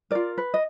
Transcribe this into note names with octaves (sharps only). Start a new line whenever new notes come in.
F4 A#4 D5
B4
D#5